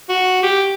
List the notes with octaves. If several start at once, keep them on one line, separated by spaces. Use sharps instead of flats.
F#4
G4